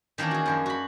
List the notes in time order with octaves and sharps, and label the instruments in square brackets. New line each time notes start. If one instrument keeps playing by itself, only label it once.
[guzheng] D#3 E3 A#3 C#4 D4
F#4 G#4
F#2 F3 D4
F#4 B5